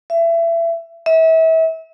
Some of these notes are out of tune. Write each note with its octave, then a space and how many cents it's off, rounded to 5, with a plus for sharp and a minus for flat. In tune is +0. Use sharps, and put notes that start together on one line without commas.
E5 +25
E5 -35